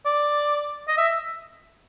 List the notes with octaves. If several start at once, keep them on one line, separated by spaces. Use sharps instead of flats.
D5
D#5
E5